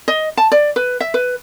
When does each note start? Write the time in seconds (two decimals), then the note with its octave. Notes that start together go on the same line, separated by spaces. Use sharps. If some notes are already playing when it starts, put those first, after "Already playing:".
0.08 D#5
0.37 A5
0.52 D5
0.76 B4
1.00 E5
1.14 B4